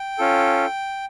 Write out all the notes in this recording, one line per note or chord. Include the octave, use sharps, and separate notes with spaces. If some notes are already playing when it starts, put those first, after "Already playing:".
Already playing: G5
C#4 F4 A4